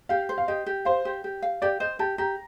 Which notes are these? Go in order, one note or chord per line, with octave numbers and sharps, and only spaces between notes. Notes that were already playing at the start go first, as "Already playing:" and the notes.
G4 F5
C5
F5
G4 D#5
G4
C5 F5
G4
G4
F5
G4 D5
C5 D#5
G4 A5
G4 A#5